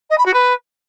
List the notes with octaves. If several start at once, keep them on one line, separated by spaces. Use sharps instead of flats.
D#5
B5
F#4
B4